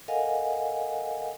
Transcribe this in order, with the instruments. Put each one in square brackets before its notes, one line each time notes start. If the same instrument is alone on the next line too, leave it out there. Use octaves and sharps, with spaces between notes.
[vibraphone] A4 A#4 D#5 F5 F#5 G#5